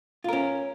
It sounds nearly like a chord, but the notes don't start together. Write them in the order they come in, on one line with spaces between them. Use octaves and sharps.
F4 A#4 C#4